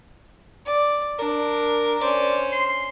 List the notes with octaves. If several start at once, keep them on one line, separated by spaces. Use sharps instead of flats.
D5
D4 A#4
C#4 C5 D5
C6